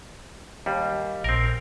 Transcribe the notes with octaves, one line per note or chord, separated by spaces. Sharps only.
D#2 G3
A#1 C4 A#4